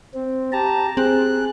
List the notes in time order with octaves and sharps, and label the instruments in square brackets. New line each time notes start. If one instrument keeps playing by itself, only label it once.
[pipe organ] C4
G4 A5 A#5
[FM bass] C4 [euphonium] G#4 [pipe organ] F#6